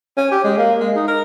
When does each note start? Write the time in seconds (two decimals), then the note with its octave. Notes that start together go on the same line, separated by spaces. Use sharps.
0.17 C#4
0.31 G4
0.44 G#3
0.58 A#3
0.80 G#3
0.96 D#4
1.08 A#4